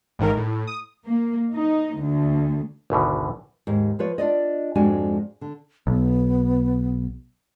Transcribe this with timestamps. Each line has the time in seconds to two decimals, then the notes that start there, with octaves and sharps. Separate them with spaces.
0.19 A1 G#2 D#3 A#4
0.37 A2
0.67 D#6
1.05 A#3
1.54 D#4
1.99 D2
2.90 G#1 D2 B2 D3
3.67 D#2 G#2
3.99 F3 F4 B4 C#5
4.18 D4 F4 D5 D#5
4.75 F2 G#2 G#3 D4 F#4 G#5
5.41 D3
5.87 B1 B3